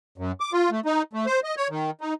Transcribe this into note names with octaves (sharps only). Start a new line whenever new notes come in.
F#2
D6
F4
A3
D#4
A3
C5
D#5
C#5
D#3
D#4